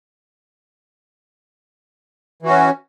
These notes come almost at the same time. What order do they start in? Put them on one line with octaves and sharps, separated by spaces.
E3 F#4 C#4